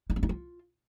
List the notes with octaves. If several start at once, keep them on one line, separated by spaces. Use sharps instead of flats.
D#4
C#4
D#4
F4